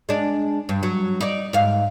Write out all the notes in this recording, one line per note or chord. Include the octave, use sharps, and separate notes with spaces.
G#3 D4
G2
F#3
D#4 D5
G#2 F5